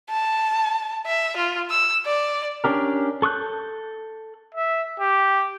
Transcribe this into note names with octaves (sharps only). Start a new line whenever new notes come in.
A5
E5
F4
E6
D5
C#4 D4 G4 A#4
A4 C#6 D#6 F#6 G6
E5
G4